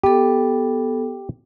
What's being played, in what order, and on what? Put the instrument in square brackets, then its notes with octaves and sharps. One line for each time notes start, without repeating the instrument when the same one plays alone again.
[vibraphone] B3 A4 [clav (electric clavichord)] G4